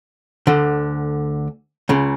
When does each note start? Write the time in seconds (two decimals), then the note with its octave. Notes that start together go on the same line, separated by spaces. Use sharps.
0.47 D2 D3
1.89 C#2 C#3